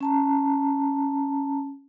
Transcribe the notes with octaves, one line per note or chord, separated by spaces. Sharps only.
C#4 A5 A#5